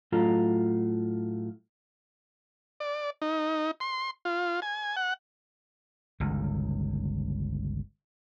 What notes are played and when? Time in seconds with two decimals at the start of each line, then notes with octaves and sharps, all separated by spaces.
0.12 A2 F#3 F4 A4 A#5
2.80 D5
3.22 D#4
3.80 C6
4.25 F4
4.62 G#5
4.96 F#5
6.20 G1 C#2 D#3